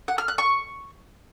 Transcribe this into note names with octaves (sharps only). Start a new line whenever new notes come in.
F#5
F6
F#6
C#6